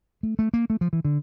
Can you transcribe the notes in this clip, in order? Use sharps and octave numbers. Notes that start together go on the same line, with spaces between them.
A3
A3
A#3
A3
F3
E3
D3